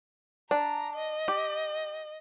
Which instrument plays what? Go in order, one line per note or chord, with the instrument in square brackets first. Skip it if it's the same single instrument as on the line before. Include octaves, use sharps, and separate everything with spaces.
[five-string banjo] D4 [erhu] A#5
[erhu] D#5
[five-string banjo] G4